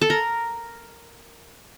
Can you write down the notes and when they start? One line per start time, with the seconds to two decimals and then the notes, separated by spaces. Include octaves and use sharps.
0.01 A4
0.10 A#4